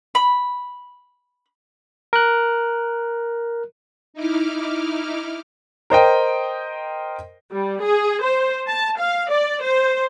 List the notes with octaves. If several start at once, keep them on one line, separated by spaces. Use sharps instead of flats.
B5
A#4 F#6
D#4 E4 D6 F6
A#4 C5 D#5 G5
G3
G#4
C5
A5
F5
D5
C5